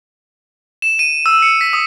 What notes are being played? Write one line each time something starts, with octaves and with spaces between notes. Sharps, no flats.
E7
D#7
E6
C#7
B6
D#6